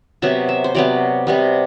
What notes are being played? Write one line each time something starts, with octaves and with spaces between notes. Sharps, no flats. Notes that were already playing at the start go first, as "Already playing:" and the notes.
C3 F#3 B3 E5
E5
C5
C3 F#3 B3 D5
C3 G3 B3